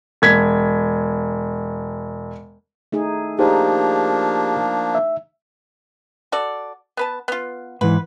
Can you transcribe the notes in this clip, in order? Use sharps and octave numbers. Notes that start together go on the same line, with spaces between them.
E1 G#6 B6
A3 D#4 G#4
F3 A#3 D4 D#4 G4 G#4 C5
E5
F#4 A4 D5
B3 B4 A5
B3 F4
G#2 E3 B4